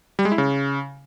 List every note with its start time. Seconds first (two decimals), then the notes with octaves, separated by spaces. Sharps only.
0.19 G3
0.25 G#3
0.32 E4
0.38 C#3